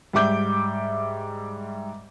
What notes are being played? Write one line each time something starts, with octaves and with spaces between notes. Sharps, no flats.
G#2 G3 E5 D6 G6